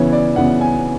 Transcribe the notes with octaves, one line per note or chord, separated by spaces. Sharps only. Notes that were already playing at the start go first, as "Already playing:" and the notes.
Already playing: C#3 E3 B3 C#5
D5
C#3 E3 B3 F#5
G#5